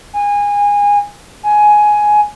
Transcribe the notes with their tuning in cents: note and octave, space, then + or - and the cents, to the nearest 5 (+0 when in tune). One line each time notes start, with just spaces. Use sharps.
G#5 -25
G#5 +10